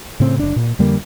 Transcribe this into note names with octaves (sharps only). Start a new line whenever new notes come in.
A2 C#3 C4
F#1 D4
A#2
F2 D3 G3 A#3